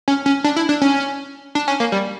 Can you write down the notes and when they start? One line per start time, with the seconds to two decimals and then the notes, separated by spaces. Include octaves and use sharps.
0.08 C#4
0.26 C#4
0.44 D4
0.56 E4
0.69 D4
0.82 C#4
1.55 D4
1.68 C#4
1.80 A#3
1.92 G3